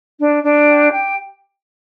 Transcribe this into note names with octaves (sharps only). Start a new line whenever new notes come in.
D4
D4
G4
G5